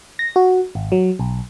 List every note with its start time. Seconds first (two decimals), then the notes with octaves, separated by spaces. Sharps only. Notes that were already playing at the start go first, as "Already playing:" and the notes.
0.19 A#6
0.36 F#4
0.75 G#1
0.92 F#3
1.19 B1